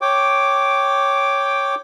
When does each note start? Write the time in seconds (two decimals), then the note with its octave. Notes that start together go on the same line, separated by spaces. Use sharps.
0.01 C#5 G5 D6